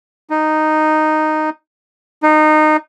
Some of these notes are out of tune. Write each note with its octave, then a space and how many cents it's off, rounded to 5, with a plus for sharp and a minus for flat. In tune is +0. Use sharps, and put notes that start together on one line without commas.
D#4 -10
D#4 -20